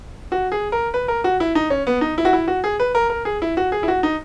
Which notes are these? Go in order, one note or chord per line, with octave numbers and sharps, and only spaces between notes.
F#4
G#4
A#4
B4
A#4
F#4
E4
D#4
C#4
B3
D#4
E4
F#4
E4
F#4
G#4
B4
A#4
A#4
G#4
E4
F#4
G#4
E4
F#4
D#4